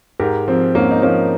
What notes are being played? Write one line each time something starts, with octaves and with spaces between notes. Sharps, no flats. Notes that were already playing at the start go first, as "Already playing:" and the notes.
G#2 G4 A#4
F3 C4
G#2 A#3 C#4
D#4
F3 A#3 C#4